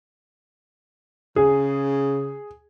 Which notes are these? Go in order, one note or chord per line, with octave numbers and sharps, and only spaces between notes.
C#3 G#4